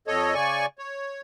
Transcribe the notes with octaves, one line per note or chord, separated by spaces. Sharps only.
F2 A4 C#5 D#5
C#3 D5 G#5 C#6
C#5